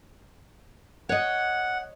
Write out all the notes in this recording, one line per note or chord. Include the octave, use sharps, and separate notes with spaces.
C#5 D#5 F#5